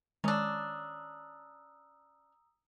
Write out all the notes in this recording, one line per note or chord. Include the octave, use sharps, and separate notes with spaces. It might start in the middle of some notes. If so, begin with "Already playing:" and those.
D#3 G#3 C#4 D4 A#5 D#6 E6